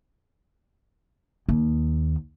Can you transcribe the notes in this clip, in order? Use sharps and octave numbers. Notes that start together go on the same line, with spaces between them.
D#2